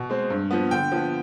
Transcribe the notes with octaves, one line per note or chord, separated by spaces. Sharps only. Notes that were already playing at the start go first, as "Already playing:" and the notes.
Already playing: B2
G#3 C4
G2
F3 B3
D3 G5
F3 B3